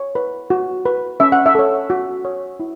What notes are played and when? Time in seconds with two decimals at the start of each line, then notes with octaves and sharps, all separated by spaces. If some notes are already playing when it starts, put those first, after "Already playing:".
Already playing: C#5
0.15 B4
0.50 F#4
0.85 B4
1.20 C#4 E5
1.32 F#5
1.46 E5
1.55 A4 C#5
1.90 F#4
2.25 C#5
2.60 E4